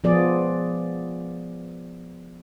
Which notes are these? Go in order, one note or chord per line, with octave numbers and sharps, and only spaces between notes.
F3 B3 G#4 D5